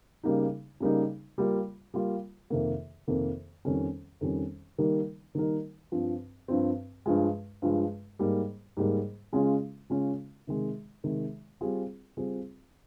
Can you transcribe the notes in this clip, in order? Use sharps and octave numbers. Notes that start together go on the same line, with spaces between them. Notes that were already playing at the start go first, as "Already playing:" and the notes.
C#3 G3 A#3 D#4
C#3 G3 A#3 D#4
G3 A#3 F4
G3 A#3 F4
F2 C3 D#3 A#3
F2 C3 D#3 A#3
F2 D#3 G3 C#4
F2 D#3 G3 C#4
D#3 G3 A#3 D#4 A#4
D#3 G3 A#3 D#4 A#4
G2 F3 C4
G2 F3 C4
G2 F3 G#3
G2 F3 G#3
G#2 G3 A#3
G#2 G3 A#3
C#3 G#3 C#4 F4
C#3 G#3 C#4 F4
C3 D#3 G#3
C3 D#3 G#3
G3 C4 F4 G#4
G3 C4 F4 G#4